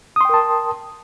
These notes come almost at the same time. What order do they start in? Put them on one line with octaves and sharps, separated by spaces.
D#6 C6 G5 A#4 A5